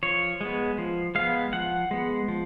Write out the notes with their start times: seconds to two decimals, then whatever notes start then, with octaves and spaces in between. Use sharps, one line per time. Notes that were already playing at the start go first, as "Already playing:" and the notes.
0.03 F3 C#5
0.41 G#3 B3
0.78 F3
1.15 G#3 B3 F5
1.53 F3 F#5
1.91 G#3 B3
2.28 F3